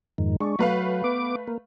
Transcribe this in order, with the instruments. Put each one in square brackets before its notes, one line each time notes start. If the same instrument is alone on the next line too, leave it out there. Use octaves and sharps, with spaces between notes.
[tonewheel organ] F2 G#2 D#3
[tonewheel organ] G#3 D4 [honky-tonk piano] C#6
[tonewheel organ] F#3 [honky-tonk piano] A3 B4 F5
[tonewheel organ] B3 D6
A#3